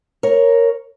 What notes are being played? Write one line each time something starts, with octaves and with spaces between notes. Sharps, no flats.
A#4 C#5